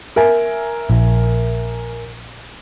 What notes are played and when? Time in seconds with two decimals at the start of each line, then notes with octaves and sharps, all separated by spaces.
0.16 A#4 E5 G#5
0.90 A#1